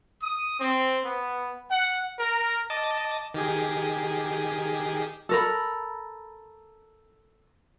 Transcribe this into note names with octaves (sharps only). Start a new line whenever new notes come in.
D#6
C4
B3
F#5
A#4
D#5 A5 D6
D#3 G4 G#4
A4 A#4 B5